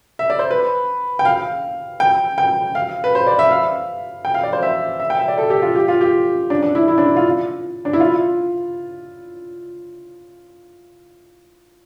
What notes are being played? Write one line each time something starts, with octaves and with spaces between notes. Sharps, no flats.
E5
D5
C5
B4
G5
F5
G5
G5
F5
B4
C5
D5
E5
F5
G5
F5
D5
C5
E5
E5
G5
E5
D5
A4
G4
F4
G4
F4
G4
D4
D4
E4
E4
D4
E4
F4
D4
E4
F4